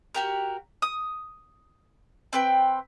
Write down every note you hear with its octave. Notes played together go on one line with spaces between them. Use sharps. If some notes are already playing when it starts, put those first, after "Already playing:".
F#4 G4 A#4
D#6
C4 B4 G5